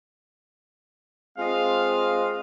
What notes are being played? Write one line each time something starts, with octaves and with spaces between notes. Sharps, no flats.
G#3 C4 F4 D#5 F5